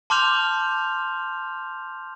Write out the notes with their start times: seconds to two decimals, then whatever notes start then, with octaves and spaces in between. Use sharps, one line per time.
0.10 A5 C6 D6 F6 G6 F7